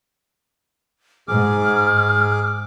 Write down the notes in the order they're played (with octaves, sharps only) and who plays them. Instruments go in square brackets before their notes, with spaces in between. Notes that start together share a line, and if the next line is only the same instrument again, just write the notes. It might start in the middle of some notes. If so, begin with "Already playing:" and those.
[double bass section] G#2 [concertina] G#4 D6 [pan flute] F6